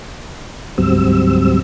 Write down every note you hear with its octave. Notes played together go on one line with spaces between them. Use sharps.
D2 G#2 F#3 G3 C4 E6